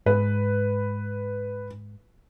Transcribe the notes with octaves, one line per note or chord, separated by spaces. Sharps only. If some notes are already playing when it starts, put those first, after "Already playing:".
G#2 B4